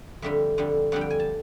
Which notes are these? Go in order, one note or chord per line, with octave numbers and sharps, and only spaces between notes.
F2 D3 G3 E5
F2 D3 G3
F2 D3 G3 F#5
G5
G#5
A5